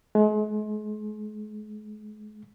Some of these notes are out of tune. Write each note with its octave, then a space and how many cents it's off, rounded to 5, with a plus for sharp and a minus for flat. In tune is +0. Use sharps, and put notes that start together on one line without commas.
G#3 +40